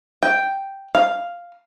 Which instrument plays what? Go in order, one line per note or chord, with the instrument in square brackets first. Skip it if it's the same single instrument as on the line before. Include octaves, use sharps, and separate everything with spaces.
[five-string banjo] G5
F5